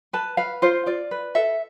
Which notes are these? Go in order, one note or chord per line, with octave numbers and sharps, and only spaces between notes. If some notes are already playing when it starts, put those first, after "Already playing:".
B4 A5
B4 F5
F4 C5
F4 D5
B4
A4 E5